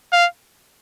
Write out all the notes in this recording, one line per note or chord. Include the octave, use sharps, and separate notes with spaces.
F5